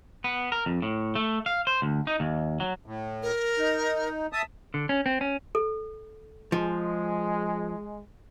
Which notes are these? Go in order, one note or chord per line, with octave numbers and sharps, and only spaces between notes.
B3
A#4
F2
A2
A3
F5
C5
D2
D#4
D#2
F#3
A2
A#4
D#4
E5 A5 D#6
D3
C#4
C4
C#4
A4
F3 G#3